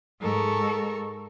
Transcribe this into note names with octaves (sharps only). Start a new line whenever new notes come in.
G#2 A4 A#4 C#6